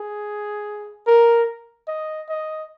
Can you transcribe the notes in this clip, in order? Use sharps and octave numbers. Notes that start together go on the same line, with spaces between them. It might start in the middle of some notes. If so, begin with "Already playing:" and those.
Already playing: G#4
A#4
D#5
D#5